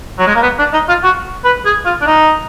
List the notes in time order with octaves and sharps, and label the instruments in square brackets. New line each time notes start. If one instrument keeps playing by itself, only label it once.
[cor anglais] F#3
G#3
A#3
B3
D4
D#4
F4
F#4
B4
G#4
F4
D4
D#4